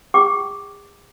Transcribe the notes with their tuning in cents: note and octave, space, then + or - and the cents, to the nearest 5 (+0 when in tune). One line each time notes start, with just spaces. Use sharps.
G#4 -45 G5 -30 D6 +0